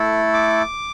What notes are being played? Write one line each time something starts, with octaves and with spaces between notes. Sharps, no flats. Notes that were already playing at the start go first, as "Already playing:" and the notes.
Already playing: A3 E4 A4
D6